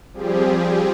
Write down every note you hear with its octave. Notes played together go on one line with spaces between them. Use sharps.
F3 G3 C4 G4 G#4